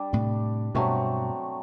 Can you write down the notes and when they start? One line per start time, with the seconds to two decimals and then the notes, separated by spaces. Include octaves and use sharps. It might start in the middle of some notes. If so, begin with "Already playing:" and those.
Already playing: G3 D4 G4
0.13 A2 C3
0.75 G2 B2 F#3 A3 C4